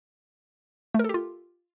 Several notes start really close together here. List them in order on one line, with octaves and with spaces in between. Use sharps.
A3 A#4 A4 G4 F4